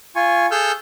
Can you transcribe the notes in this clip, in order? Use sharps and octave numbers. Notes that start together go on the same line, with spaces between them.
F4 G#5 C#6
G#4 A4 E6 F6 G6